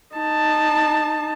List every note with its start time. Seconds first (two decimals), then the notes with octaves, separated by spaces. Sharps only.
0.16 D#4 A5